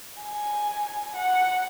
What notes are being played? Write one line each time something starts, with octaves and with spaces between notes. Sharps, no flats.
G#5
F#5